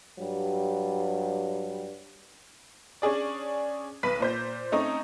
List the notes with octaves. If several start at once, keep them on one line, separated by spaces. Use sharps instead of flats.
G2 F#3 G3
C#4 D4 G#4 D5
B1 B4 B6
A#2 C5 G6
A3 C4 C#4 D#4